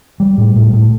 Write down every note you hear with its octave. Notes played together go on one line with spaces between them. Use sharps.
G3
A2
A2
A2